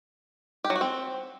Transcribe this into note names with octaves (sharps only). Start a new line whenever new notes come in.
G4
F#3
F#4
C4